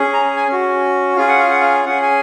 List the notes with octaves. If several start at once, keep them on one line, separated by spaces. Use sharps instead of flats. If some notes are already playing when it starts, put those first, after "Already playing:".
Already playing: C#4 G#4
A#5
G#5
C#4 F#4
C#4 F4 G#4 F5
F#5
F5
F#5
F5
C#4 G#4 F#5
G#5